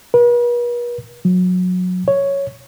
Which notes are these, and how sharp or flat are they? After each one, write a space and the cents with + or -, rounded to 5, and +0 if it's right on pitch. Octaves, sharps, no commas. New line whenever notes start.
B4 -45
F#3 -25
C#5 +0